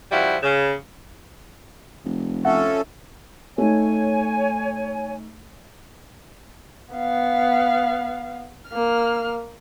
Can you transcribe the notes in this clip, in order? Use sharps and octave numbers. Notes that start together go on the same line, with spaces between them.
C#3 F3 G3 E4 F#4
C#3
F1
F3 C#4 A4 E5 F#5
A3 D#4 C#5 G#5
B3 F5
A#3 F6